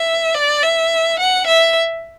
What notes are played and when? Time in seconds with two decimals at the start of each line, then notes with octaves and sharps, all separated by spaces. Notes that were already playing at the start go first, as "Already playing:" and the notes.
Already playing: E5
0.35 D5
0.63 E5
1.20 F#5
1.47 E5